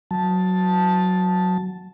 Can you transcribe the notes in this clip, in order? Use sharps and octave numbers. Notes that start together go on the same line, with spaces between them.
F#3 A5